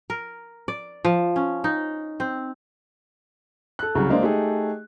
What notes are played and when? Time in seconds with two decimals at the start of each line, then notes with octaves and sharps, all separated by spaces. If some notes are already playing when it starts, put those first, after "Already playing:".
0.10 A#4
0.68 D5
1.05 F3
1.36 C#4
1.64 D#4
2.20 C4
3.79 A4 F#6
3.95 C2 C#3 F#3
4.09 G#3 A#3 D4 C5
4.23 A3 D#4 G4 G#4